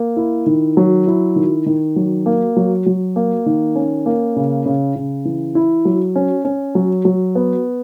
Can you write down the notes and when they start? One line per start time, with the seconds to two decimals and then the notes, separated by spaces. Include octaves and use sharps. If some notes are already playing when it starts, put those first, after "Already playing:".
Already playing: A#3
0.17 E4
0.46 D#3
0.77 F#3
1.07 E4
1.36 D#3
1.66 D#3
1.96 F#3
2.26 A#3
2.57 F#3
2.86 F#3
3.16 A#3
3.46 D#3
3.76 C#4
4.06 A#3
4.36 C#3
4.66 C#3
4.96 C#3
5.25 E3
5.55 E4
5.85 F#3
6.16 C#4
6.45 C#4
6.75 F#3
7.05 F#3
7.35 B3